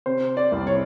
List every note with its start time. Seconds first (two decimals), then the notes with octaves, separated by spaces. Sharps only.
0.06 C3 C5
0.37 D5
0.52 C2
0.67 C#5